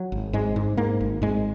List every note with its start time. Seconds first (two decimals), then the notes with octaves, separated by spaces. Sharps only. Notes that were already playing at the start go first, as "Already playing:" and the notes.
Already playing: F#3
0.12 G#1
0.33 G#2 G#3
0.56 G#2
0.77 G#2 A#3
1.01 G#1
1.22 G#2 G#3